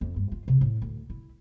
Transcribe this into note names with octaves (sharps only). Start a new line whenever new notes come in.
F2
G2
F4
C3
A2
D2
E4